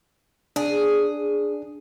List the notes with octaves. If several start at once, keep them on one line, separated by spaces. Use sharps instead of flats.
D4 G#4